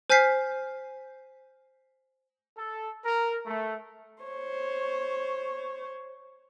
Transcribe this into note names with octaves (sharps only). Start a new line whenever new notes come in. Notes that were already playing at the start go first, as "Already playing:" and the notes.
C5 G#5 F6 G6 B6 C7
A4
A#4
A3
C5 C#5